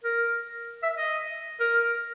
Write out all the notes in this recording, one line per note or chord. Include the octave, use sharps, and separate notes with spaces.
A#4
E5
D#5
A#4